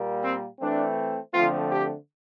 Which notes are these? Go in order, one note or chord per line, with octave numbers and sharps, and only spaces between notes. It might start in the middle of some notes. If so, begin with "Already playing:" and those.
Already playing: A#2 G3 A#3
C4
E3 A3 C4 D4
D3 F3 A3 C4 F4
G4